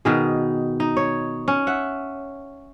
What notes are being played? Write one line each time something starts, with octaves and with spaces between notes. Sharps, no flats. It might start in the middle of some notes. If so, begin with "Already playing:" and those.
B2 D#3 G#4
D#4
C#5
C#4
E5 F#5